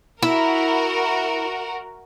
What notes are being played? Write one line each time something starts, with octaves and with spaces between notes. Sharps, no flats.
E4 F#4 A#4